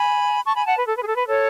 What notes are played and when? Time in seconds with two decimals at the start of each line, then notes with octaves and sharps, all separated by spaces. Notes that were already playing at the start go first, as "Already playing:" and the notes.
Already playing: G#5 B5
0.45 A5 C#6
0.55 G#5 B5
0.66 F#5 A5
0.76 B4
0.86 A4
0.97 B4
1.02 G#4
1.07 A4
1.17 B4
1.28 A4 C#5